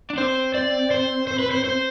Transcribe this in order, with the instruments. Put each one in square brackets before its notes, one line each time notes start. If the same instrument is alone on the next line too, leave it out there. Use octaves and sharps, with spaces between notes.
[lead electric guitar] D4
[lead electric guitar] C4 [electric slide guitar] C5
[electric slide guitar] D5
C5
C5
B4
C5
C5